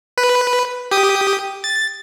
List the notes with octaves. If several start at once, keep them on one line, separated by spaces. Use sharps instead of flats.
B4
G4 D#6
A6